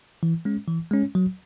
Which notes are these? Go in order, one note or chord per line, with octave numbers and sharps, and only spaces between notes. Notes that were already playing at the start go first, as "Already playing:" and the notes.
E3
G#3 C#4
E3
G#3 C#4
F#3